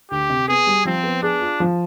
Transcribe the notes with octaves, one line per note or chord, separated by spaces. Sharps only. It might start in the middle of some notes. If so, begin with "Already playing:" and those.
D2 G4
C3
B3 G#4
G3
F3 C4
B3
D4 G#4
F4
F3